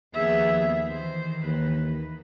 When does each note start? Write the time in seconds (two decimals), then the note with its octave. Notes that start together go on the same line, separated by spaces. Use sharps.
0.14 D#2 F3 B3 G#4 E5
0.89 D#3 E3 C5
1.43 D#2 B4